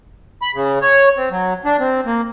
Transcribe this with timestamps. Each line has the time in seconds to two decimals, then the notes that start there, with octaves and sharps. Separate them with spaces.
0.42 B5
0.55 C#3
0.82 C#5
1.17 C4
1.31 F#3
1.65 D4
1.80 C4
2.06 A#3